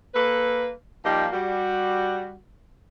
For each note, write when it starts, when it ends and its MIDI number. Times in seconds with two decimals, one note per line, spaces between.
0.15 0.71 58
0.15 0.71 69
0.15 0.71 71
1.04 1.27 53
1.04 1.27 55
1.04 1.27 58
1.04 1.27 63
1.04 1.27 67
1.33 2.35 55
1.33 2.35 66